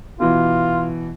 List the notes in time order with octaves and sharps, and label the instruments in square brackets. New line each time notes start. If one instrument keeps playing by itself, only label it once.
[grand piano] B2 E3 [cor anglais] F4